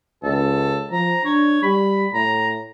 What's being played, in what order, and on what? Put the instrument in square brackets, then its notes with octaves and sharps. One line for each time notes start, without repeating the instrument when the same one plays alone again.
[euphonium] C#2 [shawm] A4
[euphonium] F3 [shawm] A#5
[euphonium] D4 [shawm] C#5
[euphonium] G3 [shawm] B5
[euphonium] A2 [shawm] A#5